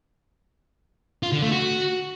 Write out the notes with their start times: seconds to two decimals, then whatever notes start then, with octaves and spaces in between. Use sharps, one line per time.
1.23 F4
1.32 D3
1.42 A3
1.52 F#4